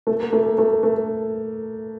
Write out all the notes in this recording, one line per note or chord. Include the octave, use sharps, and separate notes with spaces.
A3
A#3
A3
A#3
A3
A3